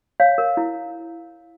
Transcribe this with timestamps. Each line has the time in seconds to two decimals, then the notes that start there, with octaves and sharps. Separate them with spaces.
0.20 C#5 F5
0.38 A#4
0.57 E4